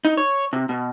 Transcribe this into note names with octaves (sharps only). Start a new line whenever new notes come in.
D#4
C#5
C3
B2